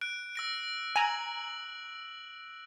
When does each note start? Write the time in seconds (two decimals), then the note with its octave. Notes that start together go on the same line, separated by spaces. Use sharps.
0.01 F#6 D7
0.35 E6 A#6 D7
0.96 G#5 A#5 E6 F#7